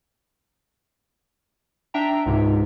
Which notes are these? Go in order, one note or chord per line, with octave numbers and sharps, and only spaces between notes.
D4 E5 G5 A#5
C#2 G#2 C3